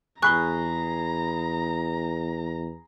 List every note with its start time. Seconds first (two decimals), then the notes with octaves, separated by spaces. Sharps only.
0.22 E2 G#4 A#5 B5 C#6 F#6 G7